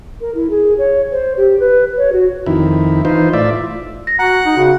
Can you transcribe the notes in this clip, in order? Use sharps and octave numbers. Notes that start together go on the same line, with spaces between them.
A#4
E4
G#4
C#5
C5
G4
B4
C#5
F#4
F2 D#3 E4
E3 D#4 F4 C5
A2 F4 D5 E5
A#6
F#4 F#5 A#5
D#4
C#3 F#4